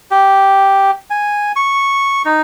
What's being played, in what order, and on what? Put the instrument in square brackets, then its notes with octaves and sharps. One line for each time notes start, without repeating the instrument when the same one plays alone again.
[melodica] G4
G#5
C#6
D#4